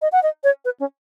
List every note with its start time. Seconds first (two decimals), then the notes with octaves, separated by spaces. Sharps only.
0.02 D#5
0.12 F#5
0.23 D#5
0.44 C#5
0.65 B4
0.80 C#4